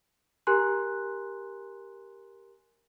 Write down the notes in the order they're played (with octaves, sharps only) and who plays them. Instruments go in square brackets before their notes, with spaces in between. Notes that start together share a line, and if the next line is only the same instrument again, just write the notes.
[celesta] G4 A#4 G#5 A#5 C6 F#6